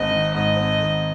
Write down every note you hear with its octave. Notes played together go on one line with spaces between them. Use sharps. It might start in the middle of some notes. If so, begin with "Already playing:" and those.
Already playing: G#1 G#2 C4 D#5
D#3
G#2 D#5
C4
G#1